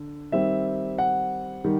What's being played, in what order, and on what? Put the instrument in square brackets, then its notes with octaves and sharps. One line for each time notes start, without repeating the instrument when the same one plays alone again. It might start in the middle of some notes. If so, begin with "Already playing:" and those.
Already playing: [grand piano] D3
D#3 G3 C4 E5
F#5
D#3 G3